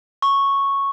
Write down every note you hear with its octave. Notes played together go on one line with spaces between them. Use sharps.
C#6